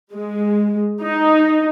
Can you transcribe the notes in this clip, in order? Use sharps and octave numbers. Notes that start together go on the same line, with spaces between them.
G#3
D#4